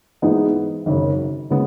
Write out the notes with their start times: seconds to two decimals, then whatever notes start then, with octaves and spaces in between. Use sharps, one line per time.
0.22 G#2 E3 G#3 B3 D#4
0.86 G#1 F#2 C#3
1.51 C#3 G#3 B3